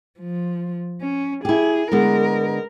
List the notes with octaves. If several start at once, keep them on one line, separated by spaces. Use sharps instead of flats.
F3
C#4
E4 G4 G#4
D3 G#3 B3 A#4